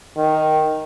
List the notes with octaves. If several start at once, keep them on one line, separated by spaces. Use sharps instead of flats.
D#3